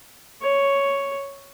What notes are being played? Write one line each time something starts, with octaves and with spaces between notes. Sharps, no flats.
C#5